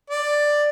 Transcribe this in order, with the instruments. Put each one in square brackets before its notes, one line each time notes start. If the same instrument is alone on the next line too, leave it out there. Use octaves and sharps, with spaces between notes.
[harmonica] D5